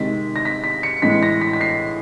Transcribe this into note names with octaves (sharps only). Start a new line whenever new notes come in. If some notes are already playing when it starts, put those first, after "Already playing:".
Already playing: C3 D#3 G#3 B6
A#6
B6
B6
C#7
A2 E3 G#3 B6
A#6
B6
B6
C7